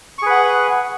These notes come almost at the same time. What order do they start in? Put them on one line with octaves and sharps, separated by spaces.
C#6 G#4 B4 F#5